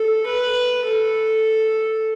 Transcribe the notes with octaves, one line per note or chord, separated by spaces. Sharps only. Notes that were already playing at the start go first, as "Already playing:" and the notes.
Already playing: A4
B4
A4